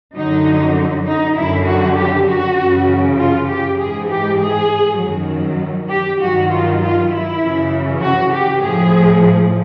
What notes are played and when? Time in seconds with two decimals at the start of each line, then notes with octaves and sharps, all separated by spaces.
0.16 F#2 D3 F#3 D#4
1.06 D#4
1.36 F#2 D3 F#3 E4
1.67 F#4
1.97 G4
2.28 F#4
2.58 F#2 C#3 E3
3.18 F4
3.49 G4
3.78 G#2 E3 G#4
4.09 G4
4.39 G#4
5.00 F#2 D#3 F#3
5.90 G4
6.20 G2 D#3 F#3 F#4
6.51 F4
6.81 F4
7.11 E4
7.42 F#2 C#3 E3
8.02 F#4
8.33 G4
8.63 A2 F3 G#4